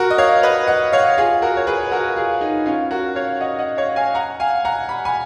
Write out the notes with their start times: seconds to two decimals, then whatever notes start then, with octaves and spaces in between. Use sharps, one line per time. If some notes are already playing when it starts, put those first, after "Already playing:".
Already playing: F#4 A#4
0.11 D#5
0.18 C#5 F5
0.43 B4 D#5
0.67 D#5 F#5
0.92 C#5 F5
1.18 F4 G#4
1.42 F#4 A#4
1.57 C#5
1.67 G#4 B4
1.92 F#4 A#4
2.16 F4 G#4
2.41 D#4
2.66 C#4 F4
2.91 F#4 A#4
3.15 C#5 F5
3.41 D#5 F#5
3.59 D#5 F#5
3.77 C#5 F5
3.96 F5 G#5
4.15 F#5 A#5
4.40 F5 G#5
4.65 F#5 A#5
4.89 B5
5.05 G#5 B5